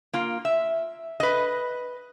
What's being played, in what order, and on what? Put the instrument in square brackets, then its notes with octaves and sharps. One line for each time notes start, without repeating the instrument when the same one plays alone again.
[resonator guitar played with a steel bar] A#3 F4
E5
B4 D#5